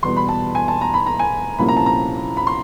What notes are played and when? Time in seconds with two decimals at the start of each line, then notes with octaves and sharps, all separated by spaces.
0.03 E2 B2 G3 B3 C6
0.17 B5
0.29 A5
0.55 G#5
0.68 A5
0.81 A#5
0.94 B5
1.06 A#5
1.19 G#5
1.58 C2 A#2 F3 A#3 C#4 B5
1.68 A#5
1.77 A5
1.86 A#5
2.37 B5
2.47 C6